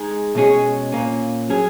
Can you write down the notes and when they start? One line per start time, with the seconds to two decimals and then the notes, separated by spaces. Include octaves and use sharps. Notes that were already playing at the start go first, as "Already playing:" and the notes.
Already playing: G#3 D#4 G#4
0.35 B2 G#3 C#4 G#4
0.92 A#2 A#3 C#4
1.49 F#3 C#4 G#4